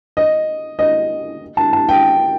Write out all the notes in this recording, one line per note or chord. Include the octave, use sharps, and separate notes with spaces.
D#5
D#5
A5
A5
G5